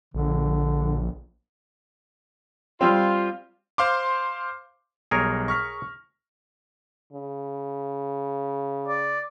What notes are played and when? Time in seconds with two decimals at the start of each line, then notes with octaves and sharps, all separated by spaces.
0.14 A#1 D3
2.81 G3 C4 F4
3.78 C5 F5 C6 D6
5.11 B1 G3 G#4 A#4 C#5 A#6
5.48 C#6 F6 A#6 B6
7.13 C#3
8.88 D5